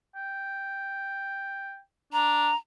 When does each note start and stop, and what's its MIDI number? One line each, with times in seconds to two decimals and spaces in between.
0.15 1.78 79
2.13 2.49 62
2.13 2.55 82